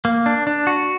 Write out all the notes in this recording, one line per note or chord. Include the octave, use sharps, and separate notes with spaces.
A#3
D4
D4
F#4